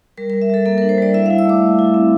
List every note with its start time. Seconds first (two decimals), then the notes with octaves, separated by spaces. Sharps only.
0.17 G3 A#4
0.30 G3 A#4
0.42 E5
0.50 G3 A4
0.66 A#3 A4
0.78 D4 A#4
0.89 C5
0.98 G3 D5
1.14 E4 E5
1.26 E4 F5
1.39 E6
1.45 A3 D6
1.62 A3
1.79 E4
1.94 C4